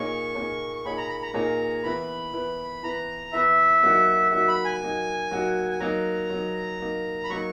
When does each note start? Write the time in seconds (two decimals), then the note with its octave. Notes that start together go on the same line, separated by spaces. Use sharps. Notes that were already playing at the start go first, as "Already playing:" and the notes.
Already playing: A#2 A#3 D#4 G#4 C#5 C#6
0.35 A#2 A#3 D#4 G#4 C#5
0.76 C#6
0.85 A#2 A#3 D#4 G#4 C#5 B5
0.97 A#5
1.09 B5
1.22 A#5
1.34 A#2 A#3 D#4 G#4 C#5 A#5
1.84 E3 B3 E4 B4 B5
2.33 E3 B3 E4 B4
2.83 E3 B3 E4 B4 A#5
3.33 E3 B3 E4 B4 E5
3.83 F#3 A#3 D#4 F#4
4.32 F#3 A#3 D#4 F#4 E5
4.48 B5
4.65 G#5
4.81 F#3 A#3 D#4 F#4
5.31 F#3 A#3 D#4 F#4
5.71 G#5
5.80 F#3 A#3 D#4 A#5
6.30 F#3 A#3 D#4
6.80 F#3 A#3 D#4
7.24 B5
7.30 F#3 A#3 D#4 C#6